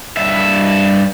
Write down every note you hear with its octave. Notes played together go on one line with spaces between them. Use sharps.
G2 E5